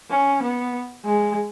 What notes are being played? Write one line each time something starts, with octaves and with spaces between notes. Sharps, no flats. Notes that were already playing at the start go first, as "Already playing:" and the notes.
C#4
B3
G#3